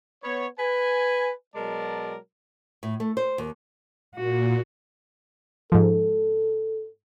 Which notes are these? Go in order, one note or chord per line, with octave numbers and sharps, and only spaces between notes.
B3 C#5
B4 G#5
B2 F#3 G#3 A#4 D5 A5
A2
A3
C5
D#2
A#2 F#4
G#2 F3 A4